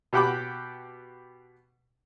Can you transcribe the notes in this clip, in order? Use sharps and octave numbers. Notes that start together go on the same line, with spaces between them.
B2 G4 F#5 G5 B5 D6